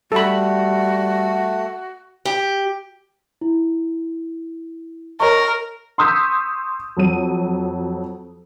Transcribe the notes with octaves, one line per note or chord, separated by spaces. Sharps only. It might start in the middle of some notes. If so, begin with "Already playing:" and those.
G3 A3 F#4 A4 B5
G4
E4
A#4 C#5 D#5 C#6
C6 C#6 D#6 E6 G6 B6
F2 F#3 D#7